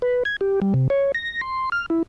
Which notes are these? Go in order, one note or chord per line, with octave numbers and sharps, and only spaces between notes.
B4
G#6
G4
G3
C3
C#5
A#6
C6
F6
E4